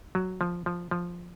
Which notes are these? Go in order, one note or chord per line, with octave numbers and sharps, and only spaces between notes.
F#3
F3
F3
F3